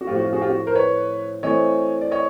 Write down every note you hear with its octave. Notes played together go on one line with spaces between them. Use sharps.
F#4
A2 F3 A3 C4 F4 G4
F#4
F4
F#4 G#4
F4 G4
F#4
A#4 C5
B4 C#5
E3 A3 C4 C#5 D#5
D5
C#5 D#5